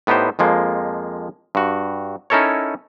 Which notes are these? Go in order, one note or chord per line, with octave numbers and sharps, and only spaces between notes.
A2 B3 D#4 G4 C5
F2 F3 G#3 A#3
G2 F#4
C#4 D#4 E4 A4 A#4 C#5